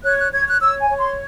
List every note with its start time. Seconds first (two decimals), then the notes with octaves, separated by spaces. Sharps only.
0.03 C#5 F#6
0.18 F#6
0.33 C#5 G#6
0.47 F#6
0.61 C#5 E6
0.79 G#5
0.90 C#5
0.99 C6